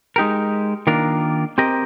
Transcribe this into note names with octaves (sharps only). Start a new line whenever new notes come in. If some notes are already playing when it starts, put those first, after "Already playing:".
G#3 D#4 G4 A#4
D#3 A#3 D4 F4 A#4
C4 G4 A#4 D#5